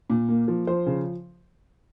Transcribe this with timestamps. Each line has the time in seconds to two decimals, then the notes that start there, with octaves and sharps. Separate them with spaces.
0.10 A#2
0.29 A#3
0.48 F3
0.67 F3 C5
0.86 C#3